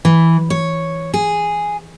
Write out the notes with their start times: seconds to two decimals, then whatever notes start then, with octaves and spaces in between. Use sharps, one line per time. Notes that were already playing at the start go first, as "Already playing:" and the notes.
0.05 E3
0.50 C#5
1.14 G#4